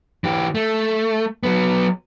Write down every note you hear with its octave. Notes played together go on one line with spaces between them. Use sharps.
E3 G4
A3
F#3 B3